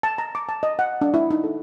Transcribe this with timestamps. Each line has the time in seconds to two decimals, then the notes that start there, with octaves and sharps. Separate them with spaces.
0.03 A5
0.18 A#5
0.35 D6
0.49 A5
0.63 D#5
0.79 F#5
1.01 D4
1.14 E4
1.30 D#4
1.44 A4